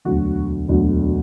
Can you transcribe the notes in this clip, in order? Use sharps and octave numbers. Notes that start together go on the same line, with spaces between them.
E1 D2 D3 F#3 F#4
E1 D2 D3 F#3